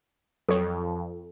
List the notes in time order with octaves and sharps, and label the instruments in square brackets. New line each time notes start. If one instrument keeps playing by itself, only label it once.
[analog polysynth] F2 [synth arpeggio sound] F#3 C#5 [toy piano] A4